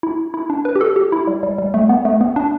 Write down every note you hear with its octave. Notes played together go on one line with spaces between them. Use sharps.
E4
E4
D4
B4
G4
A4
G4
E4
G3
G3
G3
A3
B3
A3
B3
D4